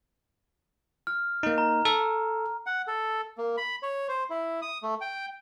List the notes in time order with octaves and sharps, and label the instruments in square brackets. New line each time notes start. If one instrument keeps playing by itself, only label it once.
[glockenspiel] F6
[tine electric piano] A#3 D#4
[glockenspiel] A#5
[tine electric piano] A4
[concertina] F#5
A4
A#3
B5
C#5
C5
E4
D#6
A3
G5